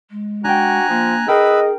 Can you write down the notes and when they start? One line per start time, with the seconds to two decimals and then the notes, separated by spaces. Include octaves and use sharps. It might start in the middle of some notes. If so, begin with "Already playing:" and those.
0.11 G#3
0.44 D4 F#4 G5 G#5 A#5 F#6
0.89 F3 A#3
1.28 G#4 A#4 B4 D#5 G5 B5 E6 F6